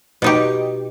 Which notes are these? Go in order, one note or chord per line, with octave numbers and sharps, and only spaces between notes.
B2 D#4 G4